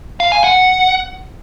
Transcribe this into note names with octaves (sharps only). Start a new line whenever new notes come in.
F5
G#5
F#5